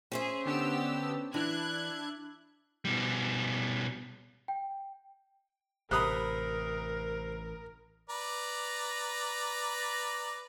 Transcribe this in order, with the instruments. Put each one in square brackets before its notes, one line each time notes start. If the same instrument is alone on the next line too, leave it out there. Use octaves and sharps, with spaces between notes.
[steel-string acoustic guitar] C#4 C5 E5 [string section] G#4
[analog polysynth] D3 B3 D4 [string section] G4 E6
[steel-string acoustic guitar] E3 [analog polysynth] D4 E4 [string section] F#6 G#6
[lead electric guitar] B2 G3
[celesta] G5
[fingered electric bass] A1 [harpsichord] C3 A#5 [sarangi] A#4 [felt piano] B5 D#6 F#6
[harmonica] B4 D5 A#5